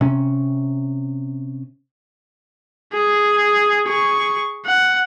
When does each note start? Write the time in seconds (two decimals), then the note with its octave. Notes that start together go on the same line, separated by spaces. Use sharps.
0.01 C3 C#4
2.93 G#4
3.88 G#4 C#6
4.66 F#5